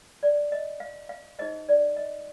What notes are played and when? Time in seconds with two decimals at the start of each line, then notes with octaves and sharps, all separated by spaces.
0.23 D5
0.52 D#5
0.80 F5
1.09 F5
1.39 D#4 G#4 C5 D#5
1.69 D5
1.97 D#5